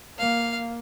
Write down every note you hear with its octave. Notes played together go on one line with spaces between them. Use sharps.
A#3 F5